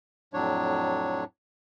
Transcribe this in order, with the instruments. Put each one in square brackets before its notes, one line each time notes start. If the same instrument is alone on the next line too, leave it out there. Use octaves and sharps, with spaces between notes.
[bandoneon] F2 A2 F#3 D4 C#5